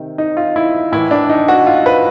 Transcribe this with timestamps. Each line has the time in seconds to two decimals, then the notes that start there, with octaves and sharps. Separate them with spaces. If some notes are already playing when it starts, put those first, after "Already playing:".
Already playing: C3 D#3
0.18 D#4
0.37 F4
0.56 E4
0.92 A2 E3 E4
1.11 D4
1.29 D#4
1.48 F#4
1.67 F4
1.86 B4